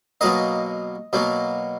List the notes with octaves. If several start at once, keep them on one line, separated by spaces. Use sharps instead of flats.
B2 F#3 A#3 D#5
B2 F#3 A#3